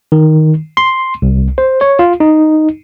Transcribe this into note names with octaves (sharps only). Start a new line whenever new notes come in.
D#3
C6
C2
C5
C#5
F4
D#4